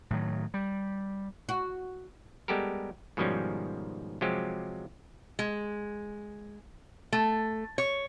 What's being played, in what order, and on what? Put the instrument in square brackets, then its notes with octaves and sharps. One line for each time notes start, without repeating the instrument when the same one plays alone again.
[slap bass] A2 D#3 F#3
G3
[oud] F#4
[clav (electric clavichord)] G3 G#3 B3 G4 A4 A#4
G#2 B2 D#3 F3 G3 C#4
C3 F3 F#3 G#3 G4
[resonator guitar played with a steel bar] G#3
A3
C#5